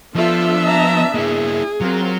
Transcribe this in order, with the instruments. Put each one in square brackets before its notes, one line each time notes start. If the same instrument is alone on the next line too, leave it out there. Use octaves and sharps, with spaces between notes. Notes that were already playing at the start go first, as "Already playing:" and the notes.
[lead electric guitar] F3 [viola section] B3 D4 E5 [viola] F4 A4
[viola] A5 A#5
[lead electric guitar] A#3 E4 [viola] G#4
[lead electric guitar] F#3 [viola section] C4 F4 A#4